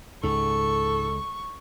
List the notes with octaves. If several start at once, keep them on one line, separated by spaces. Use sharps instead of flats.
C#2 G#2 A4 C#6